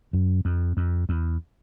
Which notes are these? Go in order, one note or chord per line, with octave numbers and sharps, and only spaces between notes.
F#2
F2
F2
E2